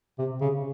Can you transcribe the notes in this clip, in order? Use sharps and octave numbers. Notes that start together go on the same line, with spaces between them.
C3
C#3